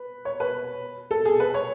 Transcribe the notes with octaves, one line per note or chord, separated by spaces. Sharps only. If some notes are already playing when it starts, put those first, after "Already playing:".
Already playing: B4
C#5
B4
A4
G#4
B4
C#5